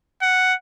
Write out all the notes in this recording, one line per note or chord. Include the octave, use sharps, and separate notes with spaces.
F#5